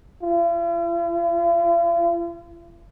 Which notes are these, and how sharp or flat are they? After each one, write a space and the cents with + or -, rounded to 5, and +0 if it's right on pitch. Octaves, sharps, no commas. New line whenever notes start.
F4 -45